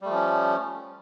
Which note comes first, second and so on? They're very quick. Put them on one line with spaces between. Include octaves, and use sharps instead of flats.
G3 A3 F3 C#4